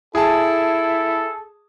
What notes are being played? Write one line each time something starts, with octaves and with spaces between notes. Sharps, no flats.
E4 G#4 A4 A5